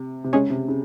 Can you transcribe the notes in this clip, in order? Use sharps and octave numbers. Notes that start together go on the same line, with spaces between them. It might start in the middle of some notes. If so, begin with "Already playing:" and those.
Already playing: C3
C3
C#3 G#3 C#4 G#4 C#5
C3
C#3